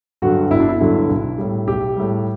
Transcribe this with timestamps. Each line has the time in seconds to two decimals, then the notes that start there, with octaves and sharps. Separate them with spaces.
0.22 G2 D3 F#3 F#4
0.51 G1 E4
0.60 D4
0.69 E4
0.80 G2 D3 F#3
1.09 B1
1.38 A2 G3
1.67 B1 G4
1.96 A2 G3